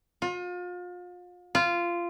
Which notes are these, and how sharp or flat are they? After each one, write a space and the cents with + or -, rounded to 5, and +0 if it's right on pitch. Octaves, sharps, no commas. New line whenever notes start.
F4 +35
F4 -15